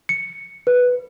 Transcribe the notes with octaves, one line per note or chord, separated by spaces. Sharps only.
C#7
B4